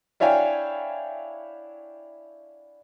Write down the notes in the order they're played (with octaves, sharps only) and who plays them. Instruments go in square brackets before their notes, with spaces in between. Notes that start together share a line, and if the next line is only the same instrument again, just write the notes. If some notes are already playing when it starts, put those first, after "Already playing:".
[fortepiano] D4 E4 C#5 F5 G5 G#5